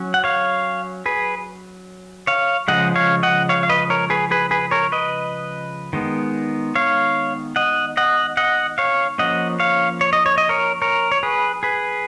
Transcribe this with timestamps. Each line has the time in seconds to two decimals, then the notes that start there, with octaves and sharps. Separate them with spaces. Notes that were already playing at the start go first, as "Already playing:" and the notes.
Already playing: F#3 C#4
0.14 F#5
0.24 C#5 F5
1.06 G#4 B4
2.27 C#5 F5
2.68 C#3 F3 G#3 D#5 F#5
2.96 C#5 F5
3.23 D#5 F#5
3.49 C#5 F5
3.63 F5
3.69 B4 D#5
3.90 A#4 C#5
4.10 G#4 B4
4.31 G#4 B4
4.51 G#4 B4
4.71 A#4 C#5
4.92 B4 D#5
5.93 D#3 G#3 B3
6.75 C#5 F5
7.56 D#5 F#5
7.97 D#5 F#5
8.37 D#5 F#5
8.78 C#5 F5
9.18 F3 A#3 C#4 D#5 F#5
9.60 C#5 F5
10.01 C#5
10.13 D#5
10.26 C#5
10.38 D#5
10.49 A#4 C#5
10.82 A#4 C#5
11.12 C#5
11.23 G#4 B4
11.63 G#4 B4